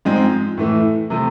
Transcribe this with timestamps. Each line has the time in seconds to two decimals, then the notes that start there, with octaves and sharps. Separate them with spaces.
0.05 G#2 F3 G#3 C4
0.58 A2 E3 A3
1.10 C3 F3 A3